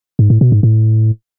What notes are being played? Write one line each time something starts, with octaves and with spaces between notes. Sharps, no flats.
G#2
A2
B2
G#2
A2